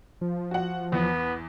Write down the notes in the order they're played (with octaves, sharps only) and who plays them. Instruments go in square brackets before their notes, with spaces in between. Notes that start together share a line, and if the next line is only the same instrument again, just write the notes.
[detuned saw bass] F3
[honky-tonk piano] F#4 F#5
[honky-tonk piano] E2 [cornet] B3